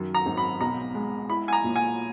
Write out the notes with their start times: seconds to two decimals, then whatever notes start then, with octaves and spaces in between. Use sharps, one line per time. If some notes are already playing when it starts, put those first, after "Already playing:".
Already playing: F#2 D#3
0.15 A#5
0.26 G#1
0.37 B5
0.61 B1 A#5
0.95 G#3
1.29 E4 B5
1.48 G#5
1.53 A#5
1.64 A#2
1.76 G#5